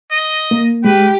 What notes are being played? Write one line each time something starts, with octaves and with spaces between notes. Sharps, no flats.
D#5
A#3
G#3 G4 B4